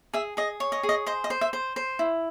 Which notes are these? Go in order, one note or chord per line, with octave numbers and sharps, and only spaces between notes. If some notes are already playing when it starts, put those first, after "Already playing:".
G#4 E5
G#4 D#5
C#5
D#5
G#4
D#5
C5 D#5
D#5
C5
E5
C5
C5
E4